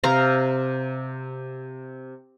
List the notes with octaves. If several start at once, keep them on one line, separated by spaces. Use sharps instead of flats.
C3 F5 A#5